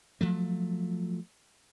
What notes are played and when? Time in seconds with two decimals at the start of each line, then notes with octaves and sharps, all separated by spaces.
0.21 F3 F#3 A3